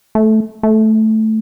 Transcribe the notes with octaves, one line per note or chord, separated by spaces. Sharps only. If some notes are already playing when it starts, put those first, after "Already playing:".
A3
A3